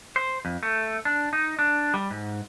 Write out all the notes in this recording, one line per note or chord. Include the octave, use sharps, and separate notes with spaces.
C5
F2
A3
D4
D#4
D4
G3
G#2